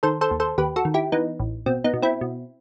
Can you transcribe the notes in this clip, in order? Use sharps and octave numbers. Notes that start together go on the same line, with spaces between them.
D#3 A4 C5
A4 C5
D#2
A4 C5
D#2 G4 B4
F#4 A4
D#3
E4 G4
E3 B3 D#4
A1
B2 C4
B3 D#4
B2
C4 E4
B2